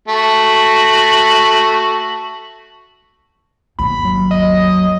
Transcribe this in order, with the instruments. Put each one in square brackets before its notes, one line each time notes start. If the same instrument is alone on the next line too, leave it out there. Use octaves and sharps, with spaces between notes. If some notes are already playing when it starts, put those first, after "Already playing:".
[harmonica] A3 F#4
[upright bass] G1 D#2 [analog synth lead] B5
[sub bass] F#3
[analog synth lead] D#5